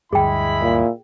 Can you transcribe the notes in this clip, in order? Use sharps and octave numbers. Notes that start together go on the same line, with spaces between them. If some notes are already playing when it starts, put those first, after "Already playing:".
D2 G2 G#3 E4 G#4 G5 B5
A#2